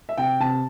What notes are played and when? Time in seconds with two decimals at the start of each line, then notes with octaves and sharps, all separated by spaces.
0.09 E5
0.18 C3 G5
0.40 C3 A5